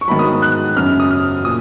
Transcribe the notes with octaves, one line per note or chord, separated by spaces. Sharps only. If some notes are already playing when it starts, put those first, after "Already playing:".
C#6
G#2 D#3 F#3 B5
D#6
F#6
F#2 C#3 F#3 F6
D#6
F6
A#2 D#6